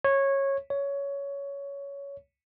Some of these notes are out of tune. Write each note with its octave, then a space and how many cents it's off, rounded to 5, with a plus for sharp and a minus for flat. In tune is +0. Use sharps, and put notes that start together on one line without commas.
C#5 -15
C#5 +15